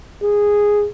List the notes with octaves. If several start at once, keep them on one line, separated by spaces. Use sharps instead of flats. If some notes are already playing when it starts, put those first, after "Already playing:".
G#4